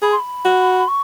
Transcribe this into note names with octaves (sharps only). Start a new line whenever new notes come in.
G#4 B5
C6
B5
F#4
C#6